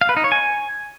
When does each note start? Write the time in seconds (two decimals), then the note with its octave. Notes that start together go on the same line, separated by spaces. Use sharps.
0.01 F5
0.09 B4
0.17 D#4
0.24 C#5
0.32 G#5